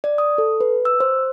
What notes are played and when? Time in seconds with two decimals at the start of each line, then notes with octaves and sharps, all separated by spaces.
0.04 D5
0.18 D#6
0.38 A4
0.60 B4
0.85 E6
1.00 C5